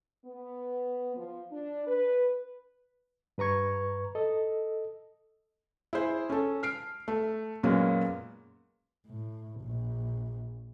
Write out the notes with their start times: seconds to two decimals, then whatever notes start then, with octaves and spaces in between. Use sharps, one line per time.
0.25 B3
1.17 F3
1.52 D4
1.87 B4
3.38 G2 B4 A#5 C#6 G#6
4.15 A4 D#5
5.93 E4 G#4 C5
6.30 C#4 A4
6.63 F6 C7 D7
7.08 A3
7.63 F#2 A#2 G#3 A#3 B3 C#4
9.07 A2
9.61 A#1